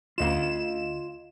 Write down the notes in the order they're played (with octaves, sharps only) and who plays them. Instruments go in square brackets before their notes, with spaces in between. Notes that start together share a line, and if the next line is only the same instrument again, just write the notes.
[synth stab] D2 E7 [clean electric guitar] F4 D#5 F5